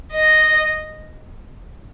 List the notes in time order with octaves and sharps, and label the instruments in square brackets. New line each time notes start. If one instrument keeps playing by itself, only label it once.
[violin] D#5